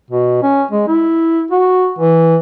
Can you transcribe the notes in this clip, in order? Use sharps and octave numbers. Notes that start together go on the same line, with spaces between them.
B2
C#4
G#3
E4
F#4
E3